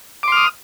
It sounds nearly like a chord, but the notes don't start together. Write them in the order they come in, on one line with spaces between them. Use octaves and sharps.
D6 C6 F6 D#6